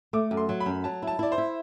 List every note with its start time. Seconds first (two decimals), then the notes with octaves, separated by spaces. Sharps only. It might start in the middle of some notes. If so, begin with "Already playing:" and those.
0.13 A3 D6
0.31 F#2
0.37 C6
0.49 F#3
0.60 B5
0.66 F#2
0.84 F#3 A5
1.02 E4 A5
1.19 E4 D5
1.32 C5
1.38 E4